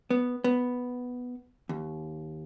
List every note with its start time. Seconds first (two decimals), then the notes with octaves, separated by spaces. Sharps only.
0.11 B3
0.44 B3
1.69 D#2